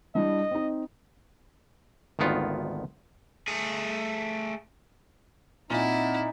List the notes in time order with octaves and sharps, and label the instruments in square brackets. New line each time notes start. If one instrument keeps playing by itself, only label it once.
[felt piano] G3 D4 E4 [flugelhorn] D#5
[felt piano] C4 D#4
[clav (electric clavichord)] G#1 D2 D#3 B3 F4
[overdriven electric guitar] A3 G#4
[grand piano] A#2 [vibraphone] C4 F#5 [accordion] D#4 [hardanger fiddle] E4